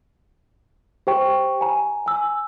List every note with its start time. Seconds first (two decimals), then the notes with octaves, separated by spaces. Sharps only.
1.07 G4 C5 G5 C#6
1.61 G#5 A#5
2.06 G#5 E6